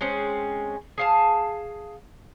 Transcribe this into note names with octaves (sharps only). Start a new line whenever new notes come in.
G#3 C4 C#4
G#4 F5 A5